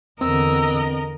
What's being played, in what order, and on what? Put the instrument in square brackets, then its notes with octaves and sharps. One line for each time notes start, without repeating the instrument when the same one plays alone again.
[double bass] E2 D3 [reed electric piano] C4 [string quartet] A#4 D#5 [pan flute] E6